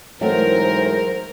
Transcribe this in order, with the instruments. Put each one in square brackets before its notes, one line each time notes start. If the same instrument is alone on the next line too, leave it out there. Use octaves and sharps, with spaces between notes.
[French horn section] G#2 E3 [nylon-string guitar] F#3 A3 C4 [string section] A#4 [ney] C5